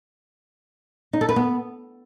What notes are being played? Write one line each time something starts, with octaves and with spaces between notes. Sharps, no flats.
D#4
A4
B4
B3